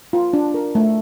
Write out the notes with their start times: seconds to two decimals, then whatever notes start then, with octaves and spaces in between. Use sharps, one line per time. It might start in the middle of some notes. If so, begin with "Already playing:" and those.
0.13 F4
0.33 D4
0.54 A#4
0.75 A3